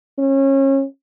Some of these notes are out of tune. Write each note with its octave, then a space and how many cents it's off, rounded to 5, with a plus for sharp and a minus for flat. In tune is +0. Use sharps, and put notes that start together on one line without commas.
C#4 -30